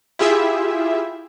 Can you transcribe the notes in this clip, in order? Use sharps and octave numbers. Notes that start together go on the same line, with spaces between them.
E4 F4 G4 G#4 E5